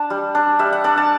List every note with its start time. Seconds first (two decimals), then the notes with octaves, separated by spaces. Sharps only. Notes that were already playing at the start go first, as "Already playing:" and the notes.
Already playing: D4 A5
0.10 G3
0.35 D4
0.59 G3 E5
0.73 F#5
0.84 D4 D5
0.97 A5